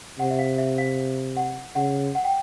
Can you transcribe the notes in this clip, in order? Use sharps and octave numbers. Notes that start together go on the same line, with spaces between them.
C3 F#5
E5
F5
E5
F5
F#5
C#3 F#5
F#5
G5